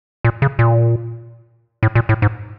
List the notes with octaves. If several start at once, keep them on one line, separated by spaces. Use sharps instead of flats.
A#2
C#3
A#2
A2
A#2
A2
G#2